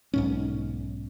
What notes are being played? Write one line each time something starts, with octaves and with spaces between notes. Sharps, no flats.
B1 G#2 C#4